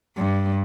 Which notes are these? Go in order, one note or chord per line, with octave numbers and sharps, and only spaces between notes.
G2